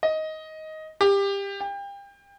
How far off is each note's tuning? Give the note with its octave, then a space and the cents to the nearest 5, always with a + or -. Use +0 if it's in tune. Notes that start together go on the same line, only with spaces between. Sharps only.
D#5 +10
G4 +20
G5 +30